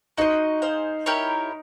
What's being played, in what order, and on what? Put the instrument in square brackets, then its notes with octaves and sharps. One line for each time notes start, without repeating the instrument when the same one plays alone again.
[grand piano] D#4 [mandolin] F#4 A4 C5 D#5
[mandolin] G#4 C5 F5
E4 G4 A#4 C#5